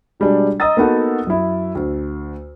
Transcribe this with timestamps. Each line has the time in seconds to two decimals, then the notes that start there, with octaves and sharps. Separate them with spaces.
0.20 B2 G3 G#3 D4
0.60 D#5 A#5 D#6 E6 A6
0.77 A#3 B3 D#4 F#4 A4
1.27 F#2 E4
1.75 D2